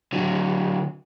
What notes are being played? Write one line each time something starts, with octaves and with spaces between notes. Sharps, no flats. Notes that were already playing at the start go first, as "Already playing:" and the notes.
D3 F#3